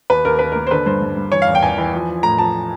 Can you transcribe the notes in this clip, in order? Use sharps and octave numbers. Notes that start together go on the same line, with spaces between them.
D#2 B4
D#2 A#4
D#2 B4
A#3 A#4
C5
D3 B4
G2 C5
G2
G2
E3 C#5
F5
E2
G5
E2 G#5
E3
F3
F3
A2 A#5
F3 A5